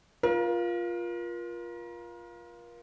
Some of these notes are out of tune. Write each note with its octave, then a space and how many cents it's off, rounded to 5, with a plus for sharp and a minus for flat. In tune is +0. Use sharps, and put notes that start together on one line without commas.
F4 +0 A#4 +35